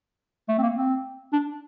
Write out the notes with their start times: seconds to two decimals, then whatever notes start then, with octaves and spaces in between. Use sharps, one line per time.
0.48 A3
0.58 C4
0.62 A#3
0.77 C4
1.33 D4